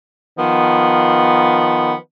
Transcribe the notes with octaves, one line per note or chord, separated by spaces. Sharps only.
D#3 F3 B3